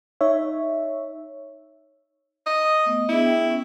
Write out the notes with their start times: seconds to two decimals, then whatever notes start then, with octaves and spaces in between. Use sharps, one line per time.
0.21 D#4 C#5 E5
2.46 D#5
2.86 A3 B3 D#5
3.09 B3 D4 E4 G#4
3.25 G5
3.50 C#4